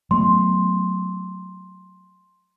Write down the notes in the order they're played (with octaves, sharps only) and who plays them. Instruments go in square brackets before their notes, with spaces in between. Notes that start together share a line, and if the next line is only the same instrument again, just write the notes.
[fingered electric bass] F#3 A3 B3 [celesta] C6